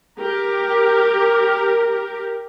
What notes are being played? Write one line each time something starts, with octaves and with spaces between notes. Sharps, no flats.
G4 A#4